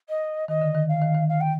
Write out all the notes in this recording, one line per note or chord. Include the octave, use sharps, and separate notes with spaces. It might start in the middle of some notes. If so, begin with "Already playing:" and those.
D#5
D#3 D#5
D3
D#3
F5
D#3
D#3
F5
G5